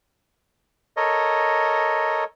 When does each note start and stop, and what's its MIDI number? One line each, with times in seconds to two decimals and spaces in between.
0.97 2.24 69
0.97 2.24 70
0.97 2.24 73
0.97 2.24 75